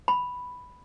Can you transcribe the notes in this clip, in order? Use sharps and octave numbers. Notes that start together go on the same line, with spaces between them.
B5